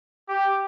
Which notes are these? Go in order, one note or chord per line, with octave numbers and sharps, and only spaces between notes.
G4